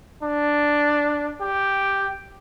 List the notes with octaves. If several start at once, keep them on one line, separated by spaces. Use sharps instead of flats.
D4
G4